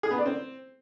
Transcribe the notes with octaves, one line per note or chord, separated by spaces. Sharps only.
G#4
B3
D5
C4